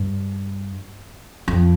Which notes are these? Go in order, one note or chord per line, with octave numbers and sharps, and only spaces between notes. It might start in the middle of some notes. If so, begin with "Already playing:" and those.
Already playing: G2
F2